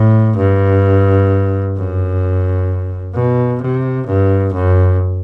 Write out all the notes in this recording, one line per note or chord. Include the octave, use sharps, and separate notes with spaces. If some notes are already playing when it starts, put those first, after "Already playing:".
Already playing: A2
G2
F#2
B2
C3
G2
F#2